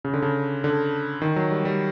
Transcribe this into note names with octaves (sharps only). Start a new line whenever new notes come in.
C#3
D3
C#3
D3
D#3
F#3
G3
G3